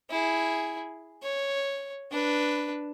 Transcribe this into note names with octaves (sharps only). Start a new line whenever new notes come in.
E4 G#4
C#5
D4 B4